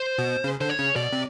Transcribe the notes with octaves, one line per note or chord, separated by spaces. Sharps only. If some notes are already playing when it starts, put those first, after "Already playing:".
Already playing: C5
B2
C#3
D3 C5
C#5
C#3
B2 D5
C3